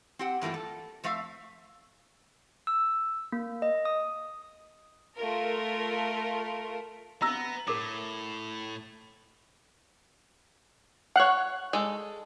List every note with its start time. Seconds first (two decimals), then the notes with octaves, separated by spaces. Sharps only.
0.19 C4 G4 F#5
0.42 G2 E3 A3 A#3 F4
0.54 A4
1.04 F2 A3 E5 F5
2.67 E6
3.32 A#3
3.62 D#5
3.85 D#6
5.17 A3 F4 A#4
7.22 B3 A#5 E6 A#6
7.68 A2 A#4 D6
11.16 C#5 F5 F#5 F#6
11.73 G#3 A4